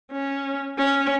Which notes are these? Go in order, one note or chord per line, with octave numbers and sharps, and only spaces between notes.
C#4
C#4